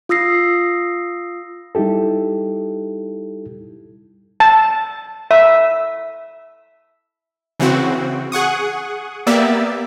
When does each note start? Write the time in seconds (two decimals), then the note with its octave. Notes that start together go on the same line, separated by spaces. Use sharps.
0.09 F4 D#6 E6 A#6 C7
1.75 G3 D#4 E4 G4 A4
4.40 A5
5.31 E5
7.60 C#3 E3 C4 F#4
8.32 G#4 F#5 C#6 D#6
9.27 A#3 B3 G4 D5 E5